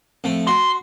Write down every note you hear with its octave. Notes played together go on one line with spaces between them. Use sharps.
F2 A3
F#4 C6